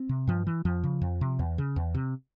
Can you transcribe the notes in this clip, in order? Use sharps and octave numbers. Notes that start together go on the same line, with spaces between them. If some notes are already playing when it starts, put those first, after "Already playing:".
Already playing: C4
C3
G2 F3
E3
F2 F3
C#3
F2
C3
E2
C#3
E2
C3